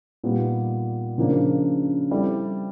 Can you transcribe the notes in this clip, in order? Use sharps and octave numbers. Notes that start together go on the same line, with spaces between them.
A#2 G3 B3 D#4 G4
C#3 F3 A#3 D4
G3 C4 E4 A4 D5